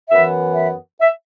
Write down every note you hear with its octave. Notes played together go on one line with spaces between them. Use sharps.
F#2 E3 B3 E5
E5
E5